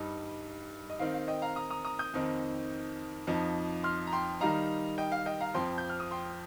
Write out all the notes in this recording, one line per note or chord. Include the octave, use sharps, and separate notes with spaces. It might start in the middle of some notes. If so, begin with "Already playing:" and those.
Already playing: G2 G3 D#4
D#5
D#3 C4 D#4 F5
F5
D#5 G5
F5 A#5
A#5 D#6
A#5 D#6
A#5 D#6
D#6 G6
F2 D#3 C4 D#4
F2 F3 D#4
C6 F6
A#5
G5 C6
D#3 G3 D#4 F5 A#5
D#5 G5
F5
D#5 G5
F5 A#5
F2 F3 C4 G5 C6
G6
F6
D#6
G5 C6